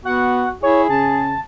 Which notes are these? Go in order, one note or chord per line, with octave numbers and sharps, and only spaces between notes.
B3 F#4 F#5
E4 G#4 C#5
C#3 A5